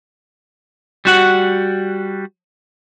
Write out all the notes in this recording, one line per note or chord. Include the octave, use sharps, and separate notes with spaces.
G3 F#4 F#5